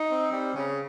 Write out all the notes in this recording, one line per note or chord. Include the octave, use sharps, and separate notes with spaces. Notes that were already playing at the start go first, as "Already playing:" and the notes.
Already playing: D#4
C4
G3
C#3